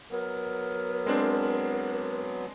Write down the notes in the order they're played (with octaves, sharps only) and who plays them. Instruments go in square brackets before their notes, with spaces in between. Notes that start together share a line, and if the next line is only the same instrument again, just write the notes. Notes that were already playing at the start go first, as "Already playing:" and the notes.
[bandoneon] F#3 B3 [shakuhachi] A#4
[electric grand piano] G#3 C4 D4